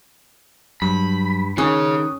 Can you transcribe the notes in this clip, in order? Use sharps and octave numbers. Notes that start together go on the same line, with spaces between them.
G2 F#3 B5
D#3 C#4 G#4 C#5 C#6 D#6 F#6